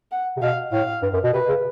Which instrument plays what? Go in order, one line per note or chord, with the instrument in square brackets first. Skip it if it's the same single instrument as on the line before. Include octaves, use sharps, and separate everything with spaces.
[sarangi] F#5
[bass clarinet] C3
[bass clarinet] B2 [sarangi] F5
[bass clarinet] A2 [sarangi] F5
[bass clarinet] G2
F#2
B2
[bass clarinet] C3 [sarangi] B4
[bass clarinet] C#3